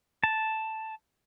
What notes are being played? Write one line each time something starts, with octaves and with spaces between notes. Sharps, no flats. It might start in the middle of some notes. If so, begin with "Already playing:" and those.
A5